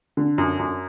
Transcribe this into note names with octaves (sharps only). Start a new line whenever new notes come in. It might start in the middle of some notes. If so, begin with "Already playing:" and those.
D3
F#2
F#2